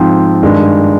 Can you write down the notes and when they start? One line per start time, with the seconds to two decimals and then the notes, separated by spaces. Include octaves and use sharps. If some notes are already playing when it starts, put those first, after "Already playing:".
Already playing: G#2 F3 C4 F4 G5
0.43 G2 D#3 G#3